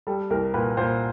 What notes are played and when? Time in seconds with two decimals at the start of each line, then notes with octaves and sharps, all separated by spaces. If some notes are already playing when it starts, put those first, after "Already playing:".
0.07 G3 A4
0.30 C2 A#4
0.54 A#2 B4
0.77 A#2 C5